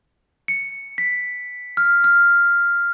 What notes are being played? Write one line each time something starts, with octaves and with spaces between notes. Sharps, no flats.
C#7
B6
F6
F6